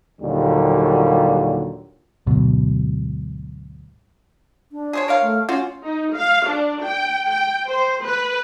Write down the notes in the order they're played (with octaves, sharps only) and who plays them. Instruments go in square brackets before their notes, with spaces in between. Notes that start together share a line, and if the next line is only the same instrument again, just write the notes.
[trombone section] D#2 A#2 D3 F#3 G3
[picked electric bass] D2 G#2 B2 F#3
[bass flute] D4
[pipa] G#4 C5 C#5
A#4 C#5 F5
[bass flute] A3
[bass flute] C#4 [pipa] F4 F#4
[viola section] D#4
F5
D4
G5
G5
C5
B4